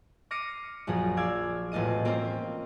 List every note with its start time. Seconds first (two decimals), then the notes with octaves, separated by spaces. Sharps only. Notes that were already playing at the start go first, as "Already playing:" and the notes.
0.31 D6 F6 A#6 C7 C#7 D#7
0.87 A#1 F#2 F3 G#4
1.17 D5 F5 E6 G#6
1.72 E1 A2 F4 D#5 D#7
2.05 A#3 C4 C#4 F4 C5